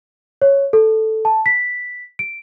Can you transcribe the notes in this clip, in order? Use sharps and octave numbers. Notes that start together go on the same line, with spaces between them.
C#5
A4
A5
B6
D7